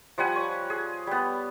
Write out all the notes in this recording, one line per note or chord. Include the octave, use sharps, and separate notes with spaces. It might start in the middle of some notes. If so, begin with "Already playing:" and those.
F3 G3 F#5 G#5
C#5
G#4
G3 B3